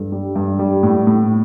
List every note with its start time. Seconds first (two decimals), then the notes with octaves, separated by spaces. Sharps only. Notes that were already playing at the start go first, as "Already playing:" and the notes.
Already playing: G2 A4
0.12 G3
0.36 G2
0.59 G3
0.83 A2
1.07 A2